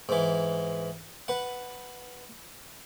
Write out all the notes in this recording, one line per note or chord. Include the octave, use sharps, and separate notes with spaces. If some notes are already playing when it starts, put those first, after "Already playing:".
G#2 E3
B4 F#5